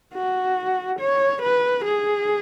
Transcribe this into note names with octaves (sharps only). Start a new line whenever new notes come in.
F#4
C#5
B4
G#4